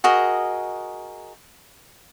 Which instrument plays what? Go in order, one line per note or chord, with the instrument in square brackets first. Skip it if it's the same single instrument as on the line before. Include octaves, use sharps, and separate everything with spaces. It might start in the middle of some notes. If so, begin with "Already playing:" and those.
[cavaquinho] F#4 G#4 A#4 D#5